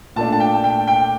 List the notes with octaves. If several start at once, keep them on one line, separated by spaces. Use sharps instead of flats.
A#2 A3 D4 A5
A5
G5
G5
G5